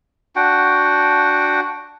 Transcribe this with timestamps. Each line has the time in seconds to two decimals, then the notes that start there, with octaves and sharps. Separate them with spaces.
0.36 D4 F#4 F#5 G5